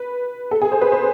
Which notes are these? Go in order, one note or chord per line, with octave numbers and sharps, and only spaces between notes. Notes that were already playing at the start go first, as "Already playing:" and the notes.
Already playing: B4
A4
G#4
C5
B4
C5